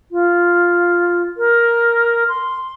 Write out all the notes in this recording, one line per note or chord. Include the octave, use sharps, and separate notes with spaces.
F4
A#4
C6